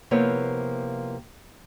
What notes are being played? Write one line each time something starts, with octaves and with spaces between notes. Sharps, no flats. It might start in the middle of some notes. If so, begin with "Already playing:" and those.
C3 F3 A#3 B3 E4 C#5